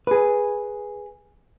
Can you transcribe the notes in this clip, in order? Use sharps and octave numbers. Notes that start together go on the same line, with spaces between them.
G#4 B4